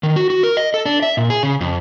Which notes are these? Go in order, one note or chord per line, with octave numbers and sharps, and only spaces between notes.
D#3
F#4
F#4
A#4
D#5
A4
D4
E5
A#2
G#4
C#3
F2